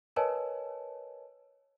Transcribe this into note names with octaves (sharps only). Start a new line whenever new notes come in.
A#4 B4 C#5 D#5 G#5 A5